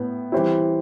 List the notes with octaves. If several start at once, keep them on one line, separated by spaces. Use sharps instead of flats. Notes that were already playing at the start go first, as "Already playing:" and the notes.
Already playing: A2 B3
E3 G3 C4 E4